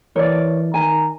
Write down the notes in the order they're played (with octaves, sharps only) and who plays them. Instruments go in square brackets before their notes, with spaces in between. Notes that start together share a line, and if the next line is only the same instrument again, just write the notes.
[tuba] E3 [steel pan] A#4 D5 [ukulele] C#5
[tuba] D#3 [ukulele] G#5 [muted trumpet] A#5